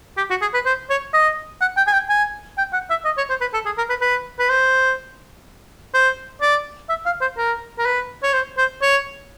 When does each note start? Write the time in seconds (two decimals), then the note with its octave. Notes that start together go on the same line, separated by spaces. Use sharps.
0.17 G4
0.30 F#4
0.41 G#4
0.54 B4
0.65 C5
0.90 C#5
1.14 D#5
1.61 F#5
1.77 G5
1.87 G#5
1.93 G5
2.09 G#5
2.58 G5
2.73 F#5
2.90 E5
3.05 D#5
3.18 C#5
3.29 C5
3.41 B4
3.53 A4
3.66 G#4
3.77 A#4
3.89 B4
4.01 B4
4.39 B4
4.50 C5
5.94 C5
6.41 D5
6.89 E5
7.06 F5
7.21 C5
7.37 A#4
7.78 A#4
7.85 B4
8.23 C#5
8.33 C5
8.58 C5
8.82 C#5